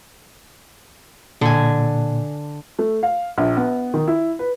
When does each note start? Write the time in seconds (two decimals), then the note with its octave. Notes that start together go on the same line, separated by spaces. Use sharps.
1.41 A#2 D3 G#5
2.79 A3
3.03 F5
3.38 A#1
3.57 B3
3.94 D#3
4.08 E4
4.39 B4